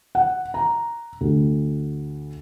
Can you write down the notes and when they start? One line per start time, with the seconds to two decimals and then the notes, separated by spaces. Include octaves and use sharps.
0.15 F#5
0.54 A#5
1.21 D2